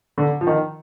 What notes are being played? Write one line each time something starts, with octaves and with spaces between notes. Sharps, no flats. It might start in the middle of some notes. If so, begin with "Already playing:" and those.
D3
F3
D#3